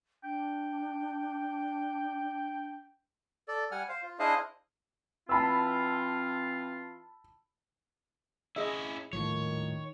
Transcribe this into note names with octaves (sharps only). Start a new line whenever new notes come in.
D4 G5
A4 D5
G3 F#5 G#5 F6
C5 F5
F4
D4 E4 G#4 C5 D#5 F5
E3 C4 F4 A5 B5 E6
C#4 E4 G#4 D#5 E5
D#1 A2 D#3 F3 C#5